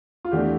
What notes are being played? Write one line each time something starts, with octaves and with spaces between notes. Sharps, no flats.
F4
E2 E3 A3 D4 G4